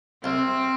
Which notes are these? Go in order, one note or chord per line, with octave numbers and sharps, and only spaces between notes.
C2 C4